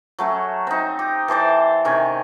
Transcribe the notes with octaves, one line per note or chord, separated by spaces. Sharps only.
F#3 A3 C#4
C4 D#4
G4
E3 A4 C5 D5
C3 D#3 C#4 G#5